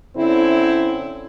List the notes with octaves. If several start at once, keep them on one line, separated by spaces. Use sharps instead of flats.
D3 C4 C#4 E4